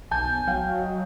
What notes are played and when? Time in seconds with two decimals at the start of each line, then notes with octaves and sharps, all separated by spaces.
0.11 B1 G#5 A5 G6
0.47 F#3 F5 G5
0.80 D#5